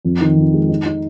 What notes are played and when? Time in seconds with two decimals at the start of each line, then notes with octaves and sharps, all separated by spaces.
0.05 F2
0.21 D#3
0.37 F2
0.54 G#3
0.69 D#4
0.86 D#4